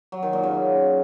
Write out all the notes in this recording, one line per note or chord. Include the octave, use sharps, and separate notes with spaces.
F#3
D#3
A#2
C#3